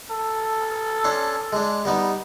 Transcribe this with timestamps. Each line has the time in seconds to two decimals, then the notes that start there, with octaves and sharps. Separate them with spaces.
0.11 A4
1.04 C#4 D4 C6
1.53 G#3 D4
1.85 G3 B3 D#4